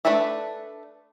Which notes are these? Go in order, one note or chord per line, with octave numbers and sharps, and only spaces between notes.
A3 D4 A4 B4 E5